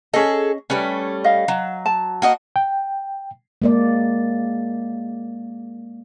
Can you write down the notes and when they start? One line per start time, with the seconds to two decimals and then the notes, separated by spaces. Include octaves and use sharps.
0.14 C#4 G#4 A4 D#5
0.70 G3 A3 C#4 B4
1.24 D#5 F5
1.48 F#3
1.86 A5
2.22 A#3 F#4 D#5
2.56 G5
3.62 G#3 A#3 D5